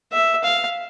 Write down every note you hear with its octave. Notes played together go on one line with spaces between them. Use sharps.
E5
F5